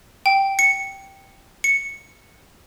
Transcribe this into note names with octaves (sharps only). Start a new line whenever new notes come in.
G5
C#7
C#7